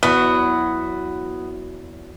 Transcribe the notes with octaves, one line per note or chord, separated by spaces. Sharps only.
E2 F#3 B3